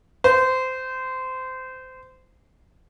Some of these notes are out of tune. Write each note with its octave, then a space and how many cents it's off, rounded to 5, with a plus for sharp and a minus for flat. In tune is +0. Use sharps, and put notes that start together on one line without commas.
C5 -20